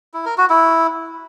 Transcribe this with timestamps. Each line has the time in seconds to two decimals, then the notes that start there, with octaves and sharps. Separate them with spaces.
0.14 E4
0.26 A#4
0.38 F#4
0.50 E4